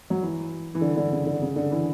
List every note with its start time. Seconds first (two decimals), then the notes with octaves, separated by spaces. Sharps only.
0.10 F#3
0.23 E3
0.75 E3
0.81 D3
0.97 D3
1.12 C#3
1.27 D3
1.42 C#3
1.56 D3
1.71 E3